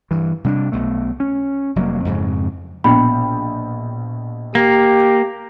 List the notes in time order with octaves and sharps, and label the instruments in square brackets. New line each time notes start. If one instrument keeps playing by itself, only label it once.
[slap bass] G2 E3
C3 G3 C#4 D4
B1 B2 A3
C#4
F1 F#3 G3 A#3
F2 G#2 C#3
[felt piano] A#1 B2 G5 [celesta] B5
[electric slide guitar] A#3 [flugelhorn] G4